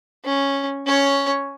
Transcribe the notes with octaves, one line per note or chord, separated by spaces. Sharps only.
C#4
C#4 C#5